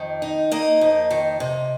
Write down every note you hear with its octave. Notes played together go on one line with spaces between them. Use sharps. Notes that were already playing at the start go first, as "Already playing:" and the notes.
Already playing: F2 D#3
D#4
A#3 D#5
F2
D#3
C3